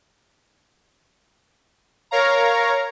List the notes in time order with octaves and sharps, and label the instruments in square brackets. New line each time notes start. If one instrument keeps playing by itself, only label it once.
[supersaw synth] A#4 C#5 F5 A#5